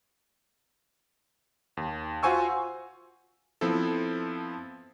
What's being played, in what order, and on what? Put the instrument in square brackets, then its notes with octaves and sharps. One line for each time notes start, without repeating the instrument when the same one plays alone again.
[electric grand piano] D#2
F4 F#4 C5 G#5 C#6 E6
F3 B3 C4 E4 A4